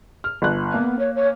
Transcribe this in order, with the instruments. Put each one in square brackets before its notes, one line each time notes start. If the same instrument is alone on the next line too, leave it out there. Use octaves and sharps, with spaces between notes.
[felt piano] F6
G1 F#6
[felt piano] A#3 [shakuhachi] B3
[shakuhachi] C#5
C#5